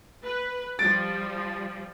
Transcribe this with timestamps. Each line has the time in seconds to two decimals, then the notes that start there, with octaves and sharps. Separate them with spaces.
0.24 B4
0.79 F3 G3 A6 D7